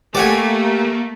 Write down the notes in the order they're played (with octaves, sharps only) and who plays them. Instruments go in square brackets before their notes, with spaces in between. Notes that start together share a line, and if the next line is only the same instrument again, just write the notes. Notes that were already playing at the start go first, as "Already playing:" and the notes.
[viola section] A3 [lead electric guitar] A#3 [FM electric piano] G4 [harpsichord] D5 F#5 G#5